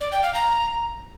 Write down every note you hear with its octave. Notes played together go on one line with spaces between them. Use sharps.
D5
G5
F5
A#5